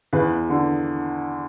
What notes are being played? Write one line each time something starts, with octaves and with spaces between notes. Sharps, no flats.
E2 B4
D3